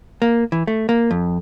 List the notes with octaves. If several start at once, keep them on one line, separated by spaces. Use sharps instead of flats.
A#3
E3
A3
A#3
F2